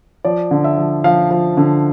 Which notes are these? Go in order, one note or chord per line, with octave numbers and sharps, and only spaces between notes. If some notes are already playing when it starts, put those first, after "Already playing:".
F3 D5
D3
E5
F3
F3 F5
F3
D3